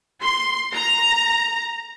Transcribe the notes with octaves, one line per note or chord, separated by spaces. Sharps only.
C6
A#5